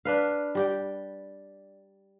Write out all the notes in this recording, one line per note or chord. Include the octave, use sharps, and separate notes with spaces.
D4 B4 F5
G3 G4 G5